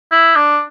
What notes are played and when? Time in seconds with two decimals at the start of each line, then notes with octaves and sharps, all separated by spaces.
0.11 E4
0.36 D4